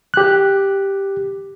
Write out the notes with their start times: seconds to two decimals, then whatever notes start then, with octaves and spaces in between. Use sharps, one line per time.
0.14 G4 F#6